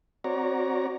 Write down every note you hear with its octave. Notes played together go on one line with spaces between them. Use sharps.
C4 F#4 C#5 D5 A#5